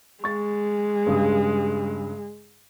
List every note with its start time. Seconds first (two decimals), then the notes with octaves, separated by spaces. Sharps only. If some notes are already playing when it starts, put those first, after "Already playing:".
0.24 G#3 C#6 A6
1.06 G2 C#3 D#6